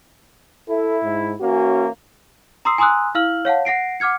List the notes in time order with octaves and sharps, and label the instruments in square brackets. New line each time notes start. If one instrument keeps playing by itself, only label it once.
[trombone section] E4 [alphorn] A4
[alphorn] G#2
[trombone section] E3 A#3 C#4 [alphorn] F#4
[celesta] A#5 C6 D#6 E6 C7
G#5 A#5 C6 D#6 E6 F#6
E4 F5 E6 F6 F#7
C#5 F5 F#5 A5
F#5 A#6 C7 D7
F#5 D6 F6 G#6 C#7